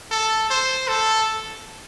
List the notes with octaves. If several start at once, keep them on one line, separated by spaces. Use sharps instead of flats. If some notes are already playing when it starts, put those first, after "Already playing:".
A4
C5
A4